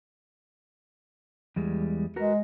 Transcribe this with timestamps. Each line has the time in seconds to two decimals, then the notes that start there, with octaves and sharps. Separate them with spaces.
1.56 E2 G3 G#3
2.16 G#3 F#4 A#4 B4